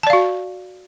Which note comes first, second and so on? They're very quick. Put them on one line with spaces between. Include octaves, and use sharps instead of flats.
A5 D5 F5 F#4